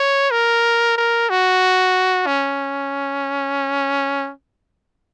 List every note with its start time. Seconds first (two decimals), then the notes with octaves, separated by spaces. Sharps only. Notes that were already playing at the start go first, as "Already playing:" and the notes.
Already playing: C#5
0.31 A#4
0.97 A#4
1.30 F#4
2.27 C#4